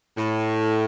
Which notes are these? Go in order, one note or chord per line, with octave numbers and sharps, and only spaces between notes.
A2